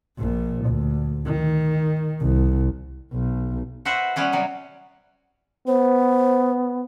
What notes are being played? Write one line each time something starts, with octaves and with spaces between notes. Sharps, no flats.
A#1 A#2
D2
D#3
C2
B1
F#4 B4 C5 E5 F#5
G3 B3 C#4 B4
C3 F#3 G3
B3 C5